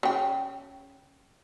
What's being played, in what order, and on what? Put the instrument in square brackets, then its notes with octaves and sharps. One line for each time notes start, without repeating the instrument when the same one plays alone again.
[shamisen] C#3 G5